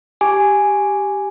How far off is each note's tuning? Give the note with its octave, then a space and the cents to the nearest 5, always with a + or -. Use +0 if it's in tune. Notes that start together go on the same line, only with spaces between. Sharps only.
G4 +0 G#5 +0 D6 +0